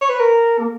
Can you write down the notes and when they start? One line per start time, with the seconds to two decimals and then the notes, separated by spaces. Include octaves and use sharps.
0.02 C#5
0.09 B4
0.19 A#4
0.59 A#3